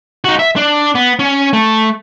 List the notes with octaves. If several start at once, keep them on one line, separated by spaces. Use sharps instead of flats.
D#4 F#4
E5
D4
B3
C#4
A3